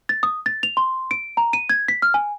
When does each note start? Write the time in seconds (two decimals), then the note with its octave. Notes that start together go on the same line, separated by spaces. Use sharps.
0.09 A6
0.23 D#6
0.46 A6
0.63 F7
0.77 C6
1.11 D7
1.37 A#5
1.53 D#7
1.70 G#6
1.88 B6
2.02 F6
2.14 G#5